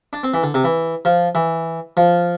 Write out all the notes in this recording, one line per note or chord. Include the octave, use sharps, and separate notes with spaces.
D4
C4
E3
D3
C3
E3
F3
E3
F3